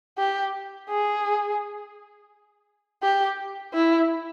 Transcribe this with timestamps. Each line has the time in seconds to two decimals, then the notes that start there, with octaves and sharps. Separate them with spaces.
0.18 G4
0.90 G#4
3.03 G4
3.74 E4